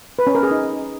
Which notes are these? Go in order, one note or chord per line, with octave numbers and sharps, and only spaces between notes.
B4
C#4
A#4
G#4
D#4